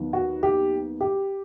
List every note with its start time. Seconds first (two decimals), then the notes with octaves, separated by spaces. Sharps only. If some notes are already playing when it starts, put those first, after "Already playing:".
Already playing: D#2 D#3 F#3 B3
0.13 F#4
0.43 G4
1.01 G4